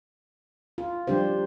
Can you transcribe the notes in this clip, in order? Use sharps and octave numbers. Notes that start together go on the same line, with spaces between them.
F4
F3 G3 D4 G4 C5